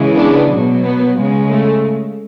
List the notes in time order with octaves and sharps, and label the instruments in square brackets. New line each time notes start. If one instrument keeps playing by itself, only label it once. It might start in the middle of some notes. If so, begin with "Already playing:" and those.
Already playing: [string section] C#3 E3 G#3
B3 D4
B2 F#3
B3
C#3 G#3
A3